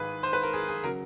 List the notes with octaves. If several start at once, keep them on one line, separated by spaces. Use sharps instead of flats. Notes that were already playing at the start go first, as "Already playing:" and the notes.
Already playing: G#1 G#2 D#3 G#3 G#4 B4
C5
B4
A#4
G#4
G#4
C#3 F#3 A#4